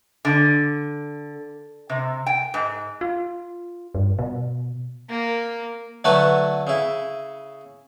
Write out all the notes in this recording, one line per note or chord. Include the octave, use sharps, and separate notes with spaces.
D3
C3
G5
G#2
F4
G2
B2
A#3
D3 F#3 A3 F#4 A4 B4
C#3 E4